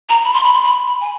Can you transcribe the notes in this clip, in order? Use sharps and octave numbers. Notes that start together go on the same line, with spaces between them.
A#5
B5
C6
B5
C6
B5
B5
G#5